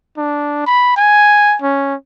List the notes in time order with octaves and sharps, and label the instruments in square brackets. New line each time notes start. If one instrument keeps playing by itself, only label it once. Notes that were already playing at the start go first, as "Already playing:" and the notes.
[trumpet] D4
B5
G#5
C#4